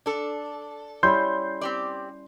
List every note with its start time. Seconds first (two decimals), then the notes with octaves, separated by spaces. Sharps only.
0.06 D4 A4
1.03 G3 C#4 E4 C6 G6
1.61 C4 G4 D5